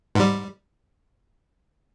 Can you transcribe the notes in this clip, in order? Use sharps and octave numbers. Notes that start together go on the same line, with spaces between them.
G#2 G3